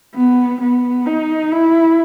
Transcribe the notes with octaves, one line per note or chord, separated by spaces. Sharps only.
B3
B3
D#4
E4